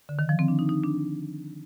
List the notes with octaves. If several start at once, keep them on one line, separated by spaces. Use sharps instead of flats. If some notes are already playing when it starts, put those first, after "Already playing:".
D3
D#3
F3
C4
D4
D#4
D#4
D4